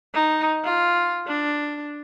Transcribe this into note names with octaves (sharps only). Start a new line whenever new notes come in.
D#4
F4
D4